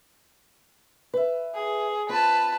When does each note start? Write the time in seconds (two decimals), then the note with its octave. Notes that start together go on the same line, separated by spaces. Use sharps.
1.14 B4 E5
1.54 G#4
2.09 C4 F4 B4 A5